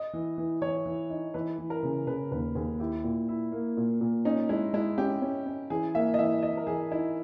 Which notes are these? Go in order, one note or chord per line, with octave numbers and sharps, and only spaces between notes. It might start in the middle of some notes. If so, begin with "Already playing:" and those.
Already playing: D#5
E3
E3
E3 C#5
E3
D#4
E3 B4
E3
A#4
C#3
C#3 B4
D#2 B4
D#2 G#4
E4 G4
A#2
E4
A#3
A#2
A#2
C#4 D#4
G#3 E4
G#3 E4
C#4 G4
C#4
C#4
E3 G#4
A#3 E5
D#5
E3 E5
E3 D#5
A#4
E3 G#4
D#4 E4